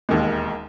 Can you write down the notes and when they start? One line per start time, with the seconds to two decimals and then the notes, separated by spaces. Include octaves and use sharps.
0.09 E1 D#2 D#3 G#3